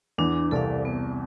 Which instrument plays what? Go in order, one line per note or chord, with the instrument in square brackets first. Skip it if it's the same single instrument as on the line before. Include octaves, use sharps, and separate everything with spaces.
[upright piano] E2 E3 [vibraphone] D4
[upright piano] C2 C3 [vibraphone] A4 D5 F5
[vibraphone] B3